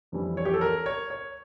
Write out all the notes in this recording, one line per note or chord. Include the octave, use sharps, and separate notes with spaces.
F2 E3 G3
C#5
G4
A4
A#4
C#5
C#5